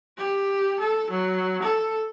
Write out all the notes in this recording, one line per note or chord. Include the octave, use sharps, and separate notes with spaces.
G4
A4
F#3
A4